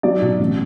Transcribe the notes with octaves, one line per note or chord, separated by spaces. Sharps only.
F#3 D5
B2
A1